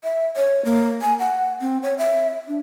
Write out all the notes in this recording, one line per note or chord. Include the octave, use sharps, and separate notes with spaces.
E5
C#5
A#3
G#5
F#5
C4
C#5
E5
D4